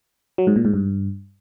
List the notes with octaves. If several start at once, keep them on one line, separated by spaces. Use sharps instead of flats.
F#3
G#2
A#2
G#2
G2